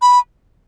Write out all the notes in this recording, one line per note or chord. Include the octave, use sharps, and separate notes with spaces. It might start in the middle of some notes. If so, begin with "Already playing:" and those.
B5